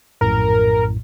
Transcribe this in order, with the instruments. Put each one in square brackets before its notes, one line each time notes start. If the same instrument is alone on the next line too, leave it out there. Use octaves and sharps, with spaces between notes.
[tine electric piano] A#1 F#2 A2 [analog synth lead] A#4